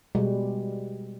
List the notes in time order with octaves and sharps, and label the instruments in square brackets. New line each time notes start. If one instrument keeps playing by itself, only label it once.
[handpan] B2 G3 G#3